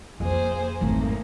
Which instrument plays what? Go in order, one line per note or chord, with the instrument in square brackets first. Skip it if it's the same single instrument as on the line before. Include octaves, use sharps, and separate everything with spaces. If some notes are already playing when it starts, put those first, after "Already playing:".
[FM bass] F2 [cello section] A#3 [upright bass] F4 [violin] G#4 C5
[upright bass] G#1 F#3 [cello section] A3 [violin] A#3